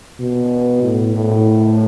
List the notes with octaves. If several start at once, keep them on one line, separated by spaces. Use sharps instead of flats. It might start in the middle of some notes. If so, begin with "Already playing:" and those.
B2
A2
A2